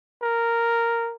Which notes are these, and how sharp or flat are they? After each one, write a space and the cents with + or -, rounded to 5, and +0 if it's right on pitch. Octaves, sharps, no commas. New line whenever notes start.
A#4 -5